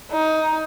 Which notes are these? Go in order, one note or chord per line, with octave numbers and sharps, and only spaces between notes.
D#4